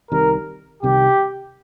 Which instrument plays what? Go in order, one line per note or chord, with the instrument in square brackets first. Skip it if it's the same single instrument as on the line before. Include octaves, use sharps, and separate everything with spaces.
[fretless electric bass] C2 C3 D#3 G3 [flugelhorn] A#4
[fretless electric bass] C2 C3 D#3 G3 [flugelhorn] G4